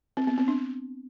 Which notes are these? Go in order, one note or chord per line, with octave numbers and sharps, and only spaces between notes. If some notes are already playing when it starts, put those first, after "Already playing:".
C4
B3
C4
D4